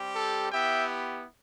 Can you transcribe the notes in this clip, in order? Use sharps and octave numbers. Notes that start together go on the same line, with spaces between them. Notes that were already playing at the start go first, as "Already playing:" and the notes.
Already playing: G3 C4 G4
A4
B3 E4 G4 E5 G5